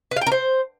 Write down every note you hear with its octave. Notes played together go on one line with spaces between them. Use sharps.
B4
F5
G5
A#4
C5